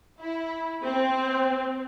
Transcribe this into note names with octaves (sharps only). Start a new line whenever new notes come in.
E4
C4